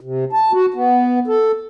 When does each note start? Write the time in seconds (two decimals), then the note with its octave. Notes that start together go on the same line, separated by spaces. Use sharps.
0.01 C3
0.33 A5
0.52 F#4
0.74 B3
1.27 A4